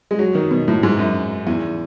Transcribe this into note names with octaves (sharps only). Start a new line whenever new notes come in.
G#3
F#3
D#3
B2
A2
G#2
F#2
E2